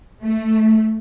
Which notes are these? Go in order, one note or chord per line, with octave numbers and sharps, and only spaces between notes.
A3